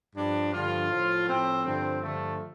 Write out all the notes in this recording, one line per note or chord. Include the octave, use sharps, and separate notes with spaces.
G2 F3 D4
G2 D3 F3 F4
A2 F3
A2 F3 C4
G2 D3 F3 C4
G2 D3 F3 A3